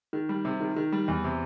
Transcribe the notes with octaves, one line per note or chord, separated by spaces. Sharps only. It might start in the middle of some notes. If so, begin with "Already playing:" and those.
D#3
G3
C3
D#3
D#3
G3
E2
C3